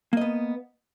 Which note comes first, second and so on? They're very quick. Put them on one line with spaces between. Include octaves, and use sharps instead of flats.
A#3 D#5 B3